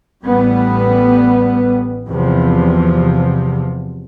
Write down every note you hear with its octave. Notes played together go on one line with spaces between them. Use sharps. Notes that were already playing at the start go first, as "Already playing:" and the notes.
A1 A2 G3 B3
E2 C3 F3